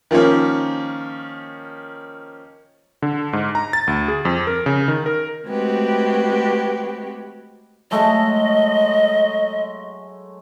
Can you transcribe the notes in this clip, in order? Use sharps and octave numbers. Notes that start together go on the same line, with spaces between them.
D#3 F3 A#3 C#4
D3
G#2
A#5
A6
D2
G#4
F2
A#4
C#3
D#3
A#4
G#3 A3 C4 F#4 G4 B4
F#3 G#3 A3 D#5